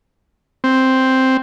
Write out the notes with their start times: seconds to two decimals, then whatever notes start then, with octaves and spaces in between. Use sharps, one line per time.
0.64 C4